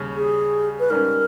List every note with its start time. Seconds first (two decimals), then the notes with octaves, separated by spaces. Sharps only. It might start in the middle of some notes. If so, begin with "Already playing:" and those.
Already playing: D#2 C#3 G3 C#4
0.16 G#4
0.80 B4
0.90 G#2 G3 C#4 A#4